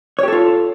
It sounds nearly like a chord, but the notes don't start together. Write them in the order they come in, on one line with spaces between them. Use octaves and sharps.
C#5 G4 A4 F4